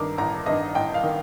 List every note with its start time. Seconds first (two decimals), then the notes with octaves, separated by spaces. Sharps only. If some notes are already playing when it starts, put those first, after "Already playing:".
Already playing: G2 D#3 A#5 D6
0.18 A1 A#5
0.46 G2 D#3 D#5
0.75 A1 G5
0.94 F5
1.04 D#3